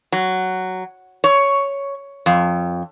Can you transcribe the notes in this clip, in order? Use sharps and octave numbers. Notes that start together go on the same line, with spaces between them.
F#3
C#5
F2